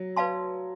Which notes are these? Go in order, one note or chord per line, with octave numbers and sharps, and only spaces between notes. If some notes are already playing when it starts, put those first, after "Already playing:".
Already playing: F#3
B4 D5 F5 A5 C6